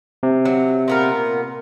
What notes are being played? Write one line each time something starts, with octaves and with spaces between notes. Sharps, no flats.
C3
F#3
A#2 B3 A#4